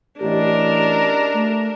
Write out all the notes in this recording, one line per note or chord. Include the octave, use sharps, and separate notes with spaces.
A1 D4 G4 A#4 D#5
A3